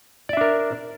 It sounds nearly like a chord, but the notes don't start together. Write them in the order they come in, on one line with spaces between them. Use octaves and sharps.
D5 E5 D4 A#4